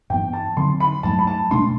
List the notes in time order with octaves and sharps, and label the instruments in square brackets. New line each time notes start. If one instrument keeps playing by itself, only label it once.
[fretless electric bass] G2 E3 B3 [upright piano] G5
[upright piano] A5
[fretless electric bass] D3 F#3 C4 [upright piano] C6
[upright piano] B5
[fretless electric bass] G2 F#3 A3 [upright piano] A5
[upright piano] B5
A5
[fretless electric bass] B2 A3 D4 [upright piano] C6